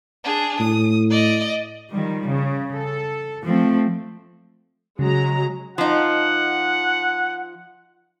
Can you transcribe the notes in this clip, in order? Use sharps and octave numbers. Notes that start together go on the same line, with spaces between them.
D4 G#4
A2 D#6
D5 D#5
D#3 F3 G3
C#3
A4
F3 A3 C4
C#3 F#3 G#3 A#5
F3 D#4 F#5